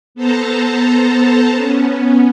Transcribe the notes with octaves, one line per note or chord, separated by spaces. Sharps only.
B3 A4 C5 A5 A#5
B3 C#4